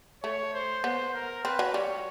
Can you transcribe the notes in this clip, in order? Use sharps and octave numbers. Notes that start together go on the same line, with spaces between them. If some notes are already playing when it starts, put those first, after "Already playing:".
A3 C#5
C5
B3 C5
A#4
C4 B4
F#3
G3 C#5